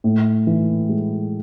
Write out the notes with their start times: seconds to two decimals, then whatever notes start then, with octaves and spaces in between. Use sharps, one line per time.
0.04 A2
0.47 E3
0.89 G#3